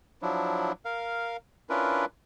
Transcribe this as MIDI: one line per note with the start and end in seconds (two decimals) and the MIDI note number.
0.22 0.72 53
0.22 0.72 54
0.22 0.72 62
0.22 0.72 64
0.85 1.37 70
0.85 1.37 77
1.70 2.05 61
1.70 2.05 62
1.70 2.05 64
1.70 2.05 65
1.70 2.05 70
1.70 2.05 71